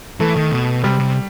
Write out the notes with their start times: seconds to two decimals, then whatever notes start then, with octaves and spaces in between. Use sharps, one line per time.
0.20 E3 A3
0.36 D#3
0.51 B2
0.84 C3 G3
0.99 C3